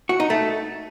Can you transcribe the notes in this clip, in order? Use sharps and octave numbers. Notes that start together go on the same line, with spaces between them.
F#4
D#4
A3